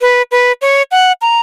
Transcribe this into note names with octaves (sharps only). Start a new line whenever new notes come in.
B4
B4
C#5
F#5
A#5